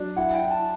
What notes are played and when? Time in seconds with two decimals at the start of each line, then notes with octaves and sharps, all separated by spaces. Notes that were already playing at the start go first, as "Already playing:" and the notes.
Already playing: F#3 D4
0.16 E4 F#5
0.34 G5
0.42 E4
0.51 A5